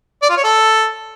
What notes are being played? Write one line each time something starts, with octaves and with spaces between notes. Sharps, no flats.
D5
F4
C#5
A4